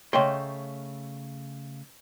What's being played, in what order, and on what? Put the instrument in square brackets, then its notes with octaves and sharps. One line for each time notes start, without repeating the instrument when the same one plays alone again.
[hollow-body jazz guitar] C#3 A3 D#5 G5 C6